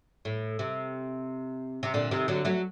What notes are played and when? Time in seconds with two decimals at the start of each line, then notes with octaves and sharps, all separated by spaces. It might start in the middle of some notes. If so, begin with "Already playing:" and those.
0.25 A2
0.59 C3
1.83 C3
1.94 A#2 D3
2.11 C3 D#3
2.28 D3 F#3
2.45 F#3 A3